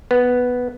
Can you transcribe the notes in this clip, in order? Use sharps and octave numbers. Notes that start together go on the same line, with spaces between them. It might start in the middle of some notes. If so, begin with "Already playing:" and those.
B3